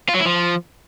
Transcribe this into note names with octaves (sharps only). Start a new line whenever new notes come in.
F4
F#3
E4
F3